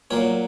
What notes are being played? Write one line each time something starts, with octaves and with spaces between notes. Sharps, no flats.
A#2 F#3 A#3 C#5